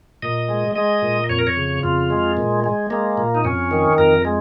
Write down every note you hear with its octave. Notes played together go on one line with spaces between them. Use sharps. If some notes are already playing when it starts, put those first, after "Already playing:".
A#2 D#5
G#3
G#3 D#5
A#2
F2 C#5
A#4
C#5
C#3
F2 F4
G#3
A#2
G#3
G#3 A#3
A#2
D#4
F2 C#4
D#3
F2 A#4
G#3